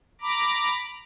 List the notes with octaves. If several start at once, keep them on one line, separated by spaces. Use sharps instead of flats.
A#5 B5 D6